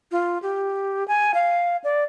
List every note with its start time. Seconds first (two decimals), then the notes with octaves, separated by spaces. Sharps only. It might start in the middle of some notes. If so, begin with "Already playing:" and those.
0.12 F4
0.42 G4
1.08 G#5
1.34 F5
1.84 D5